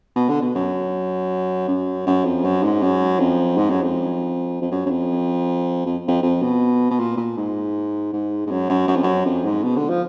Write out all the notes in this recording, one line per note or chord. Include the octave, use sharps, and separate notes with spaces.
B2
D3
B2
F#2
F#2
F#2
F2
F#2
G#2
F#2
F2
G#2
F#2
F2
F2
F#2
F#2
F2
F2
F2
F2
B2
B2
A#2
A#2
G#2
G#2
G#2
F#2
F#2
F#2
F2
F#2
F2
G#2
B2
D3
F3